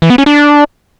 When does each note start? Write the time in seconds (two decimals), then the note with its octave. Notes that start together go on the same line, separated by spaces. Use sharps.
0.02 E3
0.10 B3
0.18 C#4
0.26 D4